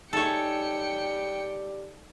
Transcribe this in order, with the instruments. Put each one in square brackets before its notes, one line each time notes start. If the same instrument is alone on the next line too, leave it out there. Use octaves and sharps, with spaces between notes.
[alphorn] G3 [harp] D#4 G#4 E5 [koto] A4 C#5 [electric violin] G5 C#7